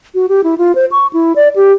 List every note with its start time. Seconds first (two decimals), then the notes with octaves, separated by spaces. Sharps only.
0.15 F#4
0.29 G4
0.44 E4
0.58 F4
0.75 C5
0.92 C#6
1.13 E4
1.36 D5
1.56 G4